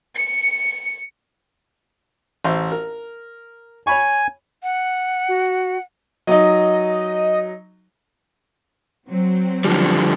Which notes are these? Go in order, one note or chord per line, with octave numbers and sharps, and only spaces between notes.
C#7
A1 C5 E5
A#4
C#5 G#5 B5 C#6
F#5
F#4
F#3 D#4 D#5
F#3 C4
D3 F3 G3